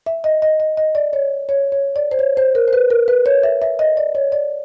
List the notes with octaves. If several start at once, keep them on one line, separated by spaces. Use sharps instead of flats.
E5
D#5
D#5
D#5
D#5
D5
C#5
C#5
C#5
D5
C5
C#5
C5
A#4
C5
B4
A#4
B4
C#5
E5
E5
D#5
D5
C#5
D5